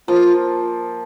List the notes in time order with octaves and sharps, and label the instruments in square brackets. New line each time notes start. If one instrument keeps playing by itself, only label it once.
[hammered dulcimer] F3 A#3 [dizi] F4